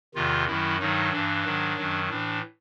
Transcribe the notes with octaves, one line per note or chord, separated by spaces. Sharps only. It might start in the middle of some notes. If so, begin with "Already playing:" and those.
E2 C3 D#3 F4
F#2 D#3 F#3 E4
G2 D#3 F#3 D#4
G2 E3 D4
G#2 D#3 F#3
F#2 D#3 F#3
A2 E3 D4